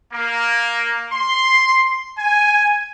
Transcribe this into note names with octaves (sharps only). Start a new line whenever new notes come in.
A#3
C6
G#5